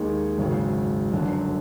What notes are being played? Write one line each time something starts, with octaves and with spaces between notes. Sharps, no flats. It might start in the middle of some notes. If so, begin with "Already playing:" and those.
Already playing: D#2 D#3 G#3
G#1 F#2 C#3
G1 F#2 D3 F#3